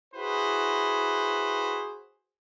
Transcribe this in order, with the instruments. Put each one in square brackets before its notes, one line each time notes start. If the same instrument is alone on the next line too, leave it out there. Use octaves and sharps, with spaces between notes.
[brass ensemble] E4 F#4 G#4 B4 C5